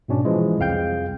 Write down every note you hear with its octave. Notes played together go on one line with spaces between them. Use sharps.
G#2 B2 C#4 D4
E3 F3 G#3
C2 F2 G#4 F5 G5 G6